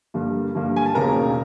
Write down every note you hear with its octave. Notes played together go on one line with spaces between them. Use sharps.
G2 D3 G3 A#3
G2 D3 G3 A#3
G#5
A5
E1 D#2 C#3 A#4 A#5